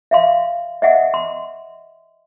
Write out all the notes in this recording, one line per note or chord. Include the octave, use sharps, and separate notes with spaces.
E5 F5 C6
D#5 E5 F#5
C6